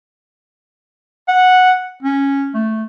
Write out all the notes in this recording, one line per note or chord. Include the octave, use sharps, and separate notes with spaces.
F#5
C#4
A3